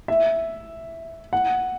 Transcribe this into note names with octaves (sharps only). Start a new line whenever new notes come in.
E5
F#5